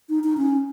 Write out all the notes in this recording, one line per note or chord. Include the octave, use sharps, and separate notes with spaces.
D#4
D#4
C#4